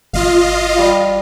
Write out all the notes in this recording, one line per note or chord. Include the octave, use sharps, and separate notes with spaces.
G1 F4 D#5 F5
G3